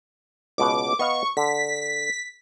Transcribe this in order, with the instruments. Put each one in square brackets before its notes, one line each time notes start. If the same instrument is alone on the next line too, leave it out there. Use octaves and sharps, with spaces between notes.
[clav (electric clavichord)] C#2 B2 F#5 [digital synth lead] D6
[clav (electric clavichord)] B3 D#5 F5 [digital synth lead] C#6
[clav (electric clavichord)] D3 [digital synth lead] B6